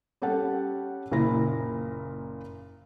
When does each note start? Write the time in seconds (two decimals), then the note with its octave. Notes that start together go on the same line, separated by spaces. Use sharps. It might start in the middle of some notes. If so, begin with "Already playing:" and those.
0.22 G3 C#4 G4 A4 F#5
1.11 F#1 A#2 C#3 E4 C5 A#6